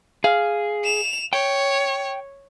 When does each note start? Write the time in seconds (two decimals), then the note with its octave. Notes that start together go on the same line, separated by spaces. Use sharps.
0.24 G#4 F5
0.84 E7 F7
1.33 C#5 G5